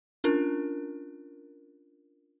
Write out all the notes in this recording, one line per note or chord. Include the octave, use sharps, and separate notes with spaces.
C#4 D4 F4 A#4